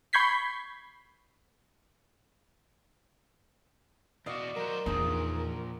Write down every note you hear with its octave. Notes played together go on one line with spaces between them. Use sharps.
B5 C#6 G6 G#6 B6 C7
E2 B2 F#4 D5 D#5 F5
F#3 A#4 C5
E2 A#2 F3 D4 D#4 G#4